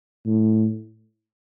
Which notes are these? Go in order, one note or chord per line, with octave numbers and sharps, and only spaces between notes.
A2